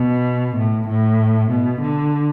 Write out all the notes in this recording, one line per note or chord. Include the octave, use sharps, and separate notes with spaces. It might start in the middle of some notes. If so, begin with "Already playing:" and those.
Already playing: B2
A2
A2
B2
D3